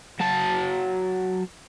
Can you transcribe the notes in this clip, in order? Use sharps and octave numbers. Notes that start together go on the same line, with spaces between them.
F#3 A5